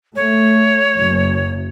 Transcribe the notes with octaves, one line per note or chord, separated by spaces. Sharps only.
A3 C#5
F#1 F#2